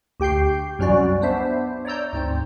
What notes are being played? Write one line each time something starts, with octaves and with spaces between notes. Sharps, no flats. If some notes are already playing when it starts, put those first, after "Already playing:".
D2 G4 G5 G6 C7
C2 F#2 F#3 C#4 F#4 D5
B3 D4 C5 E5
C#5 D5 A#5 E6 G6
D2 G#2 C4